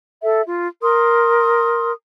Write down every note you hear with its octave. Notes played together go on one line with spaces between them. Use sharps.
A4 E5
F4
A#4 C6 D#6